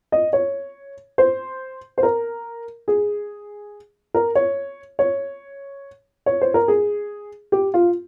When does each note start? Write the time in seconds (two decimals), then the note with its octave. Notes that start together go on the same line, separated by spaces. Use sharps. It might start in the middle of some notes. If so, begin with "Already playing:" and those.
0.12 D#5
0.33 C#5
1.18 C5
1.98 C5
2.03 A#4
2.88 G#4
4.14 A#4
4.35 C#5
4.99 C#5
6.26 C#5
6.41 C5
6.54 A#4
6.68 G#4
7.52 G4
7.74 F4